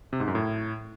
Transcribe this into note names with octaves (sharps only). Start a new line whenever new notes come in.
C3
G#2
F#2
A2